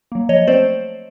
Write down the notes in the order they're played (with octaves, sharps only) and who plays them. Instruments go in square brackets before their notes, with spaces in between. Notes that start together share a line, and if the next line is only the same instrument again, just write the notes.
[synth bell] F#3 A#3
F3 C#5 D#5
A3 C4 C5 D5